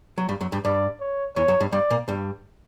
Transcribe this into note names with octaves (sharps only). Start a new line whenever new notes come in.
F#3
G2 G3
F#2 F#3
G2 G3
G2 G3 D5
C#5
E2 E3 C#5
F#2 F#3
G2 G3
G2 G3 D5
A#2 A#3
G2 G3